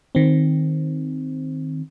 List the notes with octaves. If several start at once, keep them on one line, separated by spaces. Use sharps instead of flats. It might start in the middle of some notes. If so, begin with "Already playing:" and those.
D#3 C4